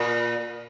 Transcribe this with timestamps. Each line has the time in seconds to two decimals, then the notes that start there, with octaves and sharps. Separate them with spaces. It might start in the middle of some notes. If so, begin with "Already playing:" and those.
Already playing: A#2